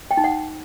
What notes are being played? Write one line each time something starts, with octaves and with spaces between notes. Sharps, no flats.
G5
D#4
F#5